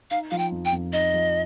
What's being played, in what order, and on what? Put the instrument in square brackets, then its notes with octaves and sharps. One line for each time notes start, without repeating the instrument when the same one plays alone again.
[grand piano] D#4 [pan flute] F5
[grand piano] F3 [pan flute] F5
[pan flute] G5
[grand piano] F2
[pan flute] G5
[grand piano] F2
[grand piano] D#4 [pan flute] D#5
[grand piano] F3